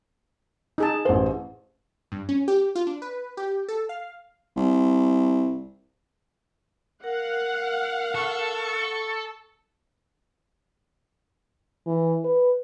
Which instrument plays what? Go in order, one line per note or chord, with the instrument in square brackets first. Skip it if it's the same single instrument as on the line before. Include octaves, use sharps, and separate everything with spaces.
[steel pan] D#4 G#4 A5
[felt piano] A1 C5
[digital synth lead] G2
C#4
G4
F4
D4
B4
G4
A4
F5
[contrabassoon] C2
[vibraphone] A#4 [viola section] F5 F#5
[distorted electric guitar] A4 [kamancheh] C#6
[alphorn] E3
B4